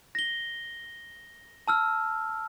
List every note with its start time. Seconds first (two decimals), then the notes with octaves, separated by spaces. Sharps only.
0.15 A#6 G7
1.68 A5 E6 F6